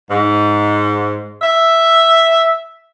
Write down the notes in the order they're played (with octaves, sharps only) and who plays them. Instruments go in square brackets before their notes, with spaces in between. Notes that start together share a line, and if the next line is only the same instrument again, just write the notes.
[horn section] G#2
E5